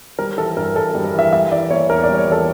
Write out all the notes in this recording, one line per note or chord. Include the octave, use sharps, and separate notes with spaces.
G3 A#4
E3 A4
G2 A#4
G2 A4
A4
G3
A#4
E3 E5
G3 E5
E3 D5
A#3 C#5
E2 A#4
D5
G3
C#5
E3 A4